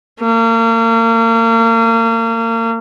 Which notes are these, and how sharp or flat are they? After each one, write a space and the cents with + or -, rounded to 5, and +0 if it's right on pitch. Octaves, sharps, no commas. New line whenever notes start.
A#3 -35